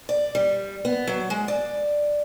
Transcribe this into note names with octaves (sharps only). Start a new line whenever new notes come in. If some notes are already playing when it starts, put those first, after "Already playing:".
D5
G3
B3
F#3
G#3
D5